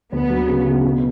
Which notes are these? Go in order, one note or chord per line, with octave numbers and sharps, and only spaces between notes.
D2 B3
F#3
C#3
C#3
B2